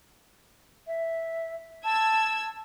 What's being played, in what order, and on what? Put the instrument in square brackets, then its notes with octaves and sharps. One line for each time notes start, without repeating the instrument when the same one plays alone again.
[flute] E5
[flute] A5 [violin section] E6 G#6